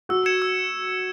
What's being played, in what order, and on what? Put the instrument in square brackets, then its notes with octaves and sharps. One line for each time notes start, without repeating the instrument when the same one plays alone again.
[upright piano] F#4 [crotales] E6
[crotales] G#6 C#7 E7
E6